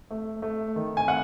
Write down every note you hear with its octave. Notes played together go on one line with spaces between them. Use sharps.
A3
A3
D#3
G#5
A3 F#5